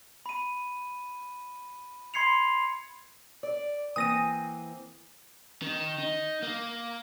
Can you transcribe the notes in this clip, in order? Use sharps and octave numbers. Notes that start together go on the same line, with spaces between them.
B5 D#7
B5 C6 G#6 C7 C#7 F7
D5
E3 A#3 C4 D#6 A#6 D#7
D#3
D#4
A#3